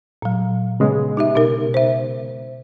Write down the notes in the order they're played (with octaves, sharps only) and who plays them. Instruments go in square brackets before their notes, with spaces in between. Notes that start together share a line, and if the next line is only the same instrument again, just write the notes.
[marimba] A#2 F#3
[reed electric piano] C#3 G#3 B3
[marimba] D#4 G4 E5
B2 D#4 A#4
C5 E5